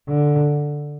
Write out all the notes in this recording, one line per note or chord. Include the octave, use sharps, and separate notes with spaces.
D3